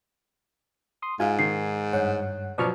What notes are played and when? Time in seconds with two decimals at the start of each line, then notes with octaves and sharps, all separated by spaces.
1.02 C6 D#6
1.20 G#2 F4 G#5
1.39 D#3 C7
1.93 G2 C#5 F#5
2.58 B2 F3 F#3 D5 C#6 F6